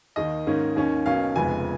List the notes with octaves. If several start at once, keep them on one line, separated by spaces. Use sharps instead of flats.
D#2 D#3 A#3 D#5
G#2 D#3 A#3 C#4
D#2 D#3 A#3 C#4
B1 B2 A#3 C#4 F5
F1 F2 C#3 G#3 B3 G#5